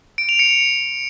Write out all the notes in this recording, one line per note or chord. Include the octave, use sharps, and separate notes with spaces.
D7
F7
C#7